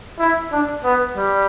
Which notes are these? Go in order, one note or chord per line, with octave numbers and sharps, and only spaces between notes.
E4
D4
B3
G3